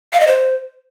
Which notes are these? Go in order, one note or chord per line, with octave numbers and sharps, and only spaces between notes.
F5
D#5
C5